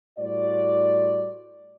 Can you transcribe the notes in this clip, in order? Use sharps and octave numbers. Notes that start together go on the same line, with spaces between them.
A2 G3 F#4 C5 D5